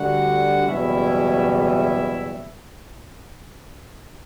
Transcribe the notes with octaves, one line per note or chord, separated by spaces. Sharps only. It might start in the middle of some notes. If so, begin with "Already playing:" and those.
Already playing: D2 D3 G3 F#4 F#5
F#1 E2 B2 G3 C#4 E4 E5
E4 E5